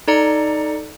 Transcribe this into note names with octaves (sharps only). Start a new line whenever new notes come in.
D#4 A4 D5 A#5 C#7